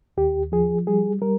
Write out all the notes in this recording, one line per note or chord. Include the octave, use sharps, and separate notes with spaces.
D#2 G4
F3 G#4
G3 G#4
G3 A#4